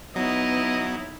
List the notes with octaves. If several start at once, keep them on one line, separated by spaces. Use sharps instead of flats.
F#3 B3 D#4 E4 D#5